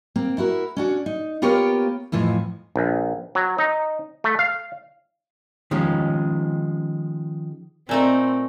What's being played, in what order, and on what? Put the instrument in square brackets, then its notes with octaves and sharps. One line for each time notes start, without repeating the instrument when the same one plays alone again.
[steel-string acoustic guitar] A#3 C4
E4 F#4 A#4
C#4 D4 F#4
D#4
A#3 B3 F4 G4 A#4 C#5
F2 A2 E3 F3
[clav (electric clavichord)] A#1
F#3
D#4
A3
F5
[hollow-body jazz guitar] D#3 F3 G#3 C#4
[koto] A#2 A3 D#4 [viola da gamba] C4